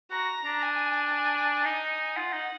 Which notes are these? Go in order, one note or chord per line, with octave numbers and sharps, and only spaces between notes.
F#4 A#5
D4
G#5
G#5
D#4 G#5
F4 F#5
D#4